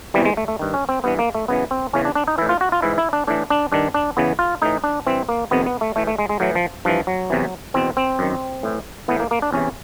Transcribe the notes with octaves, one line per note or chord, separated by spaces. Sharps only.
E2 C3 E3 G3
G#3
A3
A3
G2 D#3
C#4
C4
G2 E3 B3
A#3
A3
F#2 C#3 E3 B3
C4
E2 C#3 E3 C#4
D4
D4
D#4
A2 E3 E4
F4
F#4
F4
G#2 E3 E4
E4
D4
A2 E3 D4
D4
G2 D#3 D4
D4
E2 C#3 E3 B3
F4
A2 E3 D#4
D4
G2 E3 C4
A#3
F2 C3 D#3 B3
B3
A3
A2 E3 A3
A3
G#3
G#3
A2 E3 F#3
F3
G2 E3 F3
F#3
E2 C3 E3
E2 B2 C4
C4
F#2 D#3
A2 E3
A2 E3 B3
A#3
A#3
D4
E2 C3 E3 C#4